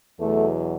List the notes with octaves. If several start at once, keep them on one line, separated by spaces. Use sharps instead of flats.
E2 B2 F#3 A3